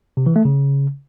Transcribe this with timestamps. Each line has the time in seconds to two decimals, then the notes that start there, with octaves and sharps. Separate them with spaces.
0.17 C3
0.26 E3
0.36 A3
0.45 C#3